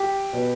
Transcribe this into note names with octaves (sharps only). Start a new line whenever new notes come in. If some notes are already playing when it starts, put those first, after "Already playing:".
Already playing: G4
B2 B3